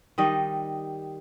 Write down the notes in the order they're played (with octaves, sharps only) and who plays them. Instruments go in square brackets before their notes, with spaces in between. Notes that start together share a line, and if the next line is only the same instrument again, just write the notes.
[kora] D#3 G3 D#5